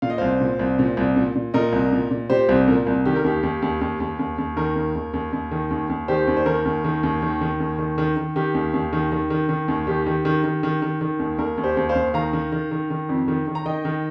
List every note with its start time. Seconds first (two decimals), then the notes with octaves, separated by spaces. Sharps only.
0.02 A#2 F5
0.10 D#5
0.18 C2 C5 F5
0.41 A#2
0.59 C2
0.79 A#2
0.97 C2
1.16 A#2
1.35 A#2
1.54 A#2 A#4 D#5
1.73 C2
1.92 A#2
2.11 A#2
2.30 A#2 G4 C5
2.49 C2
2.68 A#2 A#4
2.87 C2
3.05 D#3 G4
3.16 A#4
3.24 D#2 G4
3.43 D#2
3.62 D#2
3.81 D#2
4.00 D#2
4.19 D#2
4.38 D#2
4.57 D#3 A#4
4.76 D#2
4.95 D#2
5.14 D#2
5.33 D#2
5.51 D#3
5.71 D#2
5.90 D#2
6.08 D#3 G4 C5
6.27 D#2
6.37 C5
6.46 D#3 A#4
6.65 D#2
6.84 D#3
7.03 D#2
7.22 D#3
7.41 D#3
7.60 D#2
7.79 D#3
7.98 D#3
8.17 D#3
8.36 D#3 G4
8.54 D#2
8.74 D#2
8.93 D#3
9.12 D#3
9.30 D#3
9.49 D#3
9.68 D#2
9.87 D#3 G4
10.06 D#3
10.25 D#3
10.44 D#3
10.63 D#3
10.82 D#3
11.01 D#3
11.19 D#2
11.38 D#2 A#4
11.58 D#2
11.64 G4 C5
11.77 D#2
11.89 C5 F5
11.95 D#2
12.14 D#3 F5 A#5
12.33 D#3
12.52 D#3
12.71 D#3
12.90 D#3
13.09 F2
13.28 D#3
13.47 D#3
13.55 A#5
13.66 D#3 D#5 G5
13.85 D#3